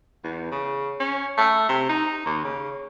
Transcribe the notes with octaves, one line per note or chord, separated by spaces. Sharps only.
E2
C#3
C#4
A3
C3
D#4
D#2
C#3